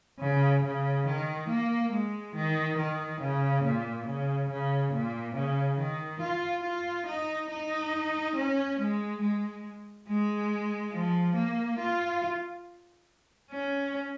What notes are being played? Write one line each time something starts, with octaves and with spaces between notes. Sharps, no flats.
C#3
C#3
D#3
A#3
G#3
D#3
D#3
C#3
A#2
C#3
C#3
A#2
C#3
D#3
F4
F4
D#4
D#4
C#4
G#3
G#3
G#3
F3
A#3
F4
C#4